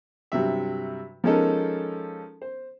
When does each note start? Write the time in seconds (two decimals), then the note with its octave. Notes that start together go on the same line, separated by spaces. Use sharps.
0.32 G2 C3 F#3 E5
1.24 F3 G#3 C#4 D#4 A4 A#4
2.42 C5